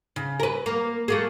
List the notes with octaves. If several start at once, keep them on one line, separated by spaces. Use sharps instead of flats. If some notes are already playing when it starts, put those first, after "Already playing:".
C#3
A#4 B4
A#3
A3 A#3 G#4